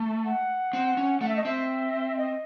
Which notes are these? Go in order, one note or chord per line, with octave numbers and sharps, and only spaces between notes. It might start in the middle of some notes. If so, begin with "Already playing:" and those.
Already playing: A3
F#5
C4
C#4
A3 F#5
E5
D#5
C4 E5
D#5